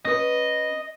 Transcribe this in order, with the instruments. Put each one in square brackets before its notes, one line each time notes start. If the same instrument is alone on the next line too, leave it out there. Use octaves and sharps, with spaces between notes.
[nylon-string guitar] C#4 B4 [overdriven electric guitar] D#5